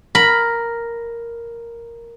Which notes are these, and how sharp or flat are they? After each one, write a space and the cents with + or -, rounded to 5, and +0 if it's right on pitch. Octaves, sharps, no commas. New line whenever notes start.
A#4 +0 B5 +0